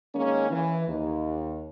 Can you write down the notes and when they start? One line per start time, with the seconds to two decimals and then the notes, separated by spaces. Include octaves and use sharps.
0.15 D#3 G#3 A#3 C#4
0.51 E3
0.88 D#2